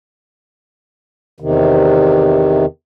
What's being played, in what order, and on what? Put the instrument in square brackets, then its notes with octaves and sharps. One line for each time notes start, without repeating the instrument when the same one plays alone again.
[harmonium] E2 C3 D#3